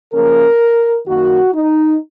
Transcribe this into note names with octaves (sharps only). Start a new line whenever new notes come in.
C#3 F3 A#3 C#4 A#4
F#2 D#3 A#3 F#4
D#4